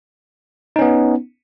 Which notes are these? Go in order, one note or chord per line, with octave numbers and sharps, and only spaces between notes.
B3 C#4 D#4